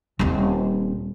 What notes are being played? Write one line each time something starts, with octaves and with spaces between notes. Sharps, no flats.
D#1 C4